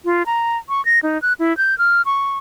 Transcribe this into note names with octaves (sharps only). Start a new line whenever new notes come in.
F4
A#5
C#6
A#6
D#4
F#6
E4
G6
F6
C#6